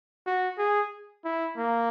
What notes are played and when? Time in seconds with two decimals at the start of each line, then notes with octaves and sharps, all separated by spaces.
0.26 F#4
0.58 G#4
1.25 E4
1.57 A#3